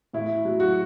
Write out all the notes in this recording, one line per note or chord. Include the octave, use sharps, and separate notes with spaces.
A2 E4
F#3
F#4